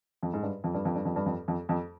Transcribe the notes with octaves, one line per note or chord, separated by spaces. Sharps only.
F2
G#2
G2
F2
G2
F2
G2
F2
G2
F2
F2
F2